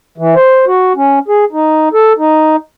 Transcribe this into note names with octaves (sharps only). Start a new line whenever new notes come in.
E3
C5
F#4
C#4
G#4
D#4
A4
D#4